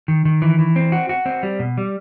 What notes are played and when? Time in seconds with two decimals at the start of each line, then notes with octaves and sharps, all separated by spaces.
0.08 D#3
0.25 D#3
0.42 E3
0.59 E3
0.76 C4
0.92 F#4
1.09 F#4
1.26 C4
1.43 G3
1.59 B2
1.78 G3